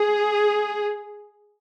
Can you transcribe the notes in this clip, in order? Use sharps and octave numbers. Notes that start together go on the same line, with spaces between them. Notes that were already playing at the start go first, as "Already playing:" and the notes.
Already playing: G#4